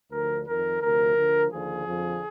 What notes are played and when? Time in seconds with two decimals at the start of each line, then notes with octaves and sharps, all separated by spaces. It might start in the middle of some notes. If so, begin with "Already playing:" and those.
0.10 D2 D3 F3 A#4
0.45 F2 D#3 A#4
0.81 D2 C3 F3 A#4
1.16 D2 D3 F3
1.51 D#2 D3 F3 G#4
1.86 F2 D3 F3